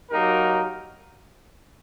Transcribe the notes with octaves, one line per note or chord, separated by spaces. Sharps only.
F#3 A#3 D#4 G4 A#4